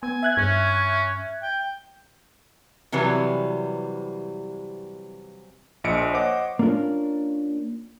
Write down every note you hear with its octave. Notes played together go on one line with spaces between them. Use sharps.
B3 G#5
E5 F#6 G#6
G2 C#4
G5
C3 E3 F#3 G3 B4
A#1 A#2 F3 D#5 C#7 D7
C5 C#5 D#5 F#5 D6
A#3 C#4 D4 F4 A#4